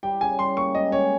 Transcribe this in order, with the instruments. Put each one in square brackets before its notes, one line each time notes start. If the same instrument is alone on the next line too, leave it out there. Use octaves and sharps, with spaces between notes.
[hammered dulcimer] G3 [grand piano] G5
[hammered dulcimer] C#3 [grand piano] G#5
[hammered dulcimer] G3 [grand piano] C6
[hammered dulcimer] A#3 [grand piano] C#6
[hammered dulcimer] G#3 [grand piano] D#5
[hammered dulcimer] C#4 [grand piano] C#5